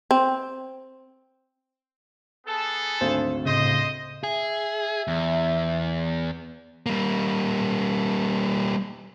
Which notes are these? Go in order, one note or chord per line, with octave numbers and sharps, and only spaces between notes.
C4
B3 G#4 A4
G#1 D2 C5
A2 C#3 C5 D#5
G#4 E5
E2
G3 A#3